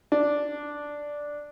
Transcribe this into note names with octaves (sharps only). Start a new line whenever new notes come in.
D4